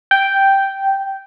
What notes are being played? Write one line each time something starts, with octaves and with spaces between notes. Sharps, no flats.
G5